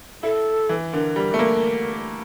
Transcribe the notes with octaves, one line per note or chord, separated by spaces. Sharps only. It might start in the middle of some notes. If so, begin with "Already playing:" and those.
E4 A4
E3
D3 A#4
G3
A3
A#3